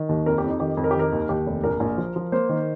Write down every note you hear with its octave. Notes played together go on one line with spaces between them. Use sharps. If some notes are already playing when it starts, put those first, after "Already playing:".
Already playing: D#3
D#2
F2 A#4
G4
F2 D#4
D#3 G4
F2
A#4
G4
D#3 A#4
D#2
D#2 G4
F1
A#1 A#4
A#1
F3
F3
A#3 C5
D#3